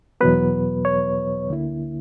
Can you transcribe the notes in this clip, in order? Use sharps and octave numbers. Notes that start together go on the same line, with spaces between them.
E2 B2 F#3 B3 B4
C#5
D2 D3 A#3 E4